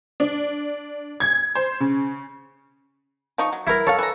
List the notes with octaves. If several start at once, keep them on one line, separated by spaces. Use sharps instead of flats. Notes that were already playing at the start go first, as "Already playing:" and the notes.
D4
G#6
C5
C#3
F3 D#4 C#6
F#3
E4 A#4
A4 C#5 F5
E3 A#5